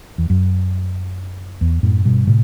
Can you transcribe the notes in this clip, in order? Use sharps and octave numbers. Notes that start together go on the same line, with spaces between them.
E2
F#2
E2
F#2 A2
G2 B2
A2 C3